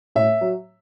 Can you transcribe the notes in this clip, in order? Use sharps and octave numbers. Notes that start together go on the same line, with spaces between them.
A2 E5
F#3